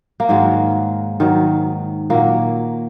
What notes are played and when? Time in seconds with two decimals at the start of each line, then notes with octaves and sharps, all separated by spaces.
0.20 A#3
0.29 G#2 D#3 F#3 G#3
1.20 G#2 D#3 F#3
2.10 A#2 F#3 A#3